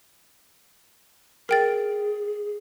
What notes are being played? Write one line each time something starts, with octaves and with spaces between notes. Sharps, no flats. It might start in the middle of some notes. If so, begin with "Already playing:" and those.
G#4 A#4 G5 A6